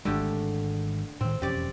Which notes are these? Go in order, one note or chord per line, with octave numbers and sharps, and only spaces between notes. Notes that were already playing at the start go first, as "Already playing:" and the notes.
G#1 D3 G#3 A3 G4
A2 D#3 C4
E1 F2 C#4 G4 D5